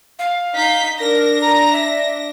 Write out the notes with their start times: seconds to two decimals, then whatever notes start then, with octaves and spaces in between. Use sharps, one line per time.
0.19 F5
0.54 D#4 G6 B6
1.00 D4 A#4 A#6
1.41 A#5
1.73 E5